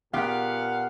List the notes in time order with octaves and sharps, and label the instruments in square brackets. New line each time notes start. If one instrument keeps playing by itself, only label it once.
[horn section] A#2 F5 F#5 [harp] B3 G4